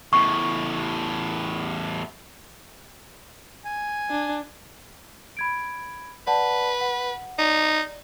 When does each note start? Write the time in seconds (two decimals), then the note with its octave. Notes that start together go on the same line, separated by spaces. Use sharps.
0.13 E2 A2 C#6
3.65 G#5
4.11 D4
5.37 B5 G#6 D7
6.27 B4 D5 F#5 A5
6.81 F#5
7.38 D#4 D5